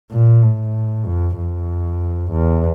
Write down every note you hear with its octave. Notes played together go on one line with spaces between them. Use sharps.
A#2
A2
F2
F2
E2